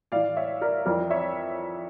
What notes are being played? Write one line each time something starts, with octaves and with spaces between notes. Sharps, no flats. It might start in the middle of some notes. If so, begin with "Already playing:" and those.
A2 E3 D5 F5
C#5 E5
A#4 D5
F2 E3 A#4 D5
C#5 E5